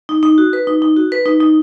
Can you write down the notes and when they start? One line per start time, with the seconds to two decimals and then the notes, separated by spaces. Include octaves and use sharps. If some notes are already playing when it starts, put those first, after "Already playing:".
0.09 D#4
0.23 D#4
0.38 F#4
0.53 B4
0.67 D#4
0.82 D#4
0.97 F#4
1.12 B4
1.26 D#4
1.40 D#4